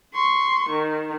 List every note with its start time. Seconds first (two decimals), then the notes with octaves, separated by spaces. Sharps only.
0.14 C6 C#6
0.70 D#3